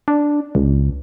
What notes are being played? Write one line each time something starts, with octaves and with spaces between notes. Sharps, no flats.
D4
C#2